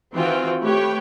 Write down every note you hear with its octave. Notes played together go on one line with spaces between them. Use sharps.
D#3 E3 C4 F4 F#4 G5
A3 G4 B4 C#5 G5